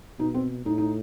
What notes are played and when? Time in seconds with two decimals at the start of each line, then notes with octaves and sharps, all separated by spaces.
0.19 B2 D#4
0.34 C4
0.65 A2 D#4
0.78 D#4